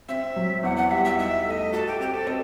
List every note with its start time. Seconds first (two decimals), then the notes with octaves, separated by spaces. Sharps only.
0.08 C4 E5
0.36 F#3
0.63 E2 F#5
0.77 F#5
0.91 G3 E5
1.05 E5
1.18 D#4 E5
1.46 A3 E5
1.50 D#5
1.73 F#4 A4
1.87 G4
2.00 C4 G4
2.14 A4
2.27 C4 D#5